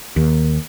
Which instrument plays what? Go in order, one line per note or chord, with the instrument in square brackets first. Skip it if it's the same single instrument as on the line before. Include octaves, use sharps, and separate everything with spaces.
[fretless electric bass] D#2